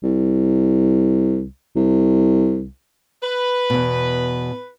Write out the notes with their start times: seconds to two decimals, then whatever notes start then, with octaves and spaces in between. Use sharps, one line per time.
0.03 C2
1.76 C2
3.23 B4
3.70 E2 B2